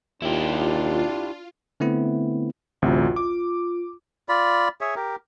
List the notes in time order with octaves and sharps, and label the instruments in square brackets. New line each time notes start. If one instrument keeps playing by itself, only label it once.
[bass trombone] D#2 [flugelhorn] D4 [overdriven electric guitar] E4 G4 [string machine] F4
[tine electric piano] D3 A3 B3 C4 E4
[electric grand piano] A1 D2 C3 [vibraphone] F4 F#4
[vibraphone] F4 [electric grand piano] D6
[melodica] F4 D5 B5
G#4 C#5 E5
G4 A#4